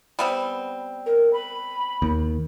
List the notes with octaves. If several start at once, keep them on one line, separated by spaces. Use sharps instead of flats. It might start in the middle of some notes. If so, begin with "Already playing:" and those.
G3 B3 C4
A#4
B5
D#2